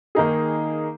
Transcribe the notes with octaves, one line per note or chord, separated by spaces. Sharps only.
D#3 A#3 D#4 G#4